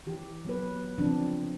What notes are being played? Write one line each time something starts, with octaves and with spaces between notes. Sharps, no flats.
E3 G4
F#3 B3 B4
B3
C#3 F3 C4 D4